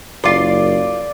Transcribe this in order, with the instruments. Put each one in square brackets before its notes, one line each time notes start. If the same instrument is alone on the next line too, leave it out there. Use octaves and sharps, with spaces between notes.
[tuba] F#1 [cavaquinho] F4 C6 [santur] D5 D6